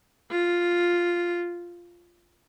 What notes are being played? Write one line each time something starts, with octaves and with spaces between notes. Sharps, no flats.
F4